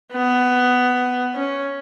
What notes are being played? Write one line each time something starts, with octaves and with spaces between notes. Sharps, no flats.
B3
C#4